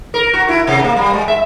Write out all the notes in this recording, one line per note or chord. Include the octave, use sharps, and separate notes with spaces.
A#4
F#4
E4
C3
A#3
G3
G#3
E5